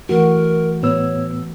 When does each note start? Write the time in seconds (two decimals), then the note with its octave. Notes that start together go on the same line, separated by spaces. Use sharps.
0.09 E3 A3 F#4 A#4
0.83 A2 B3 C#5 E6